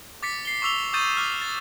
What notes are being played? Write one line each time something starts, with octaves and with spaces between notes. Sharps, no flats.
D6 A6 B6 C#7
C7 G7
C#6 D6 E6 F7 G7
C#6 D#6 G6 A6 D#7
D6 F6
A6